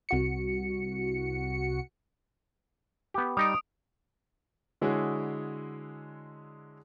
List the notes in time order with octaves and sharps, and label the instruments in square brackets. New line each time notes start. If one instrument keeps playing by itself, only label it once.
[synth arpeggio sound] C2 F#4 C#7
[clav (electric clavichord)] B3 G4
[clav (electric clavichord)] G3 D#4 [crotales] D#6 D7
[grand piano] D3 G#3 E4 F#4 G#4 C#5